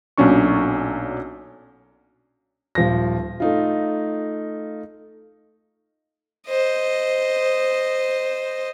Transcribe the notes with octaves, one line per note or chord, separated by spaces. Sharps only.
B1 A#2 F#3 C#4 D4 C#6
D#1 F3 A#6
A3 D#4 F4
C5 D#5